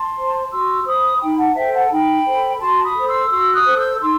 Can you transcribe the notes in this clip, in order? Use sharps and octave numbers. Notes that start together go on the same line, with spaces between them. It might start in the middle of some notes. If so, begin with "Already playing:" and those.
Already playing: A5 C6
C5
F#4 C6 E6
C5 B5 D#6
D#4 G5 B5
F#5 A5
A4 C5 E5 G5
F#5 A5
D#4 G5 B5
A4 C5
F#4 A5 C6
B5 D#6
A4 C5
C6 E6
F#4 C6 E6
D#6 F#6
A4 C5
E6 G6
D#4 C6 E6